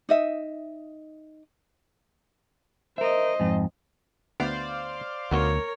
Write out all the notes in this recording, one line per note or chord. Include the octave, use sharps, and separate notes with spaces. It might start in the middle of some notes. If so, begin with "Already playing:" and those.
D#4 D#5 E5
A#4 C5 D#5 E5
F2 G#2
D2 B3 C5 D5 F5
D2 B3 D#4 F#4 A#4 C#5